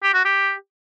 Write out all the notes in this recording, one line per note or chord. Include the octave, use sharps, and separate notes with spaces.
G4
F#4
G4